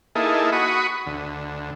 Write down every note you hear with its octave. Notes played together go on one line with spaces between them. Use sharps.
A#3 D#4 E4 G#4 A4
F#4 B5 C#6 D#6
D2